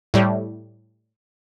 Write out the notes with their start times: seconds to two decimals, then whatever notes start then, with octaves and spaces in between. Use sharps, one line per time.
0.14 A2 G3